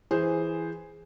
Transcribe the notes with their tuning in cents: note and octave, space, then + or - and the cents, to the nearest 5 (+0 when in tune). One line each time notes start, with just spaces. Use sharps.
E3 +5 G#4 +0 C5 +0